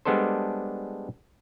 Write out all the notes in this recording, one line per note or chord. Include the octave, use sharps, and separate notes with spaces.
G3 G#3 B3 D4 A4 C5